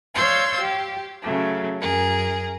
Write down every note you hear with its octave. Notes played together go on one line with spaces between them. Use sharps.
C#5 D5 F5 C6 E6 G6
G4
C#3 F#3 A3
F#2 G#4 A#4